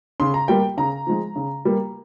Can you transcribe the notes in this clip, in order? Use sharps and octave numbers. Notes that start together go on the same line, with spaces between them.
C#3 C6
A#5
G3 A#3 G5
C#3 A#5
F3 G#3
C#3
G3 A#3